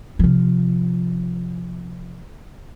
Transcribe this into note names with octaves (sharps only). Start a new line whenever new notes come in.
C3 F3